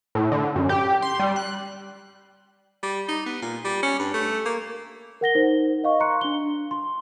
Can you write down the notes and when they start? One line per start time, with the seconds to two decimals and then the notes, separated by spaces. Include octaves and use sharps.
0.15 A2
0.32 D3
0.56 F#2
0.69 G4
1.02 C6
1.20 G3
1.36 F#6
2.83 G3
3.08 D#4
3.26 B3
3.42 A#2
3.65 G3
3.83 C#4
3.99 G2
4.14 A3
4.46 A#3
5.21 A#4 F#5 A#6 G7
5.35 D#4 A#4 C5
5.84 D#5 F5 C#6
6.00 A#5 C6 C#6 F#6 C#7
6.21 D4 G7
6.71 C6